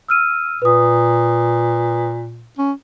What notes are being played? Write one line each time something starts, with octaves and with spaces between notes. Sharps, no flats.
E6 F6 D#7
A#2 B4 D#6
C#4